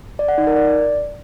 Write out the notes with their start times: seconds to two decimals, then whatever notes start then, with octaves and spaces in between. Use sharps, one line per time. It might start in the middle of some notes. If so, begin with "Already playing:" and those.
0.19 D5
0.28 F#5
0.38 D#4
0.47 A#4
0.56 D5